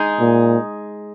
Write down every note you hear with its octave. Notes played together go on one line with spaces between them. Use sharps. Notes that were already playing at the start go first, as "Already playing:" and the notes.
Already playing: G#3 D#4 G#4
A#2